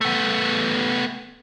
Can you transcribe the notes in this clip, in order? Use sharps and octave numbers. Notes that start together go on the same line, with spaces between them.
A3 B3